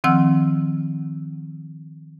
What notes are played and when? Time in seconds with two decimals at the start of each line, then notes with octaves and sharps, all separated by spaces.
0.04 D#3 F3 C4 F#5 E6 F6